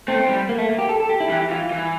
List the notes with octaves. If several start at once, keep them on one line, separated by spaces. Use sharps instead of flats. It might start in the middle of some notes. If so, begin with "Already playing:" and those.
A3 C4
G3
A#3
A3
A#3
G4
A4
A4
G4
E4
E3 G4
E3 F4
E3